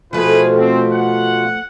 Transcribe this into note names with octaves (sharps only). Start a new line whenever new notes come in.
B2 F3 A3 E4 F4 G#4 B4
C4
F#5